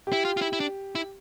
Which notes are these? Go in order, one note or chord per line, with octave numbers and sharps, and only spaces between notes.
G4
E4
F4
F4
E4
E4
D4
E4